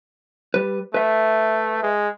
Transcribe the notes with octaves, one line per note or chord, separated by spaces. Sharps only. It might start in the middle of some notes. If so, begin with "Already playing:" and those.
G3 B4
A3 B4 E5
G#3